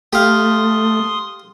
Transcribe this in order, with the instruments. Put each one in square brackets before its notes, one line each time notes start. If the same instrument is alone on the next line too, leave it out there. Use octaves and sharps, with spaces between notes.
[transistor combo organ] A3 [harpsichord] G4 F5 [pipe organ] C6 D#6